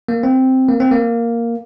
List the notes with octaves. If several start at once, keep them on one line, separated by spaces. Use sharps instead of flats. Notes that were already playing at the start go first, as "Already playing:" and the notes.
A#3
C4
A#3
C4
A#3